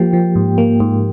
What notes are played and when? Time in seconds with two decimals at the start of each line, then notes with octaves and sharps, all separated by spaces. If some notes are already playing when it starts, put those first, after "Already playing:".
Already playing: F3 A#3 G4 G5
0.13 F3
0.36 G#2
0.58 A#3
0.80 G#2